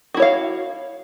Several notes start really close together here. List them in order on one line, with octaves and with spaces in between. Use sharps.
F#4 E4 C#5 F5